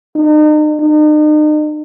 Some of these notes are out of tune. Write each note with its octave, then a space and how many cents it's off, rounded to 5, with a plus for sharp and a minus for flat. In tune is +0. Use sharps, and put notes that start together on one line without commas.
D#4 -40
D#4 -40